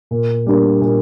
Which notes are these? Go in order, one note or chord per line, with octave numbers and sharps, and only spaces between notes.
A#2
G3 A#3 D4
A#2